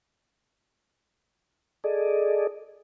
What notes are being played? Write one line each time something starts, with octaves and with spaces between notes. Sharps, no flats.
G#4 A4 D5 D#5